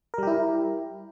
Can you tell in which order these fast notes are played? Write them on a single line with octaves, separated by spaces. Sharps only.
A#4 G3 G4 E4